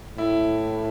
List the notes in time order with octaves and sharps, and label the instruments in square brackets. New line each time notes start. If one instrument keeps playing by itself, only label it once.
[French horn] A2 [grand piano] E4